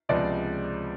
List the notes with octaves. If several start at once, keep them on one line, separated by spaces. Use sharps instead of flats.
C#2 C3 F3 G#3 B3 D5